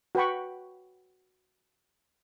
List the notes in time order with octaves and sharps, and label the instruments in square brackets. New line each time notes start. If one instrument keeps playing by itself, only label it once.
[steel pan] F#4 B4 G5 B5 C#6